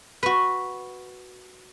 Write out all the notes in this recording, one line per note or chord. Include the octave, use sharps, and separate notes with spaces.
F#4 B4